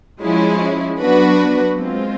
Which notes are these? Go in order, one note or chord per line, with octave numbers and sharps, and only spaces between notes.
F3 G#3 C#4 E4
F#3 B3 D4 F#4 B4
G#3 C4 F4